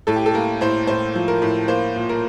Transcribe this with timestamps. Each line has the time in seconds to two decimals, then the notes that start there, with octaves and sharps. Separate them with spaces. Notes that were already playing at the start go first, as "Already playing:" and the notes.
0.07 A2 A4
0.16 G4
0.26 A4
0.34 A#3 A#4
0.61 A2 C5
0.87 A2 C5
1.15 F3
1.28 A#4
1.42 A2
1.68 A#3 C5
1.96 A#2
2.09 A#4